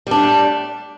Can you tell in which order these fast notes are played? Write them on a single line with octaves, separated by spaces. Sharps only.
G3 D4 A3